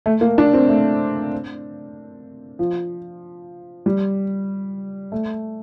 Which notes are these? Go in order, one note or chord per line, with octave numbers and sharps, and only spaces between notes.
A3
A#3
D4
C4
A3
F3
G3
A3